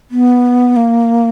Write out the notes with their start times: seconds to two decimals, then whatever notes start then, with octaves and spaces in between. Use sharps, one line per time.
0.11 B3
0.76 A#3